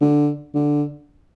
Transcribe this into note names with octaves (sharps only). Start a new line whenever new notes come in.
D3
D3